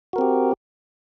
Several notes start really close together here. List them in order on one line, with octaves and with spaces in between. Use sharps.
F#4 A#4 C4 G4